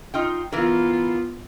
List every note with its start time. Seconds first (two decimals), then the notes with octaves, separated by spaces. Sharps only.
0.14 D#4 F4 G5
0.52 E3 B3 F4 A#4